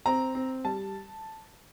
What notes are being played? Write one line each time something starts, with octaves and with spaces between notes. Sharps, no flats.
C4 A#5
C4
G3 A5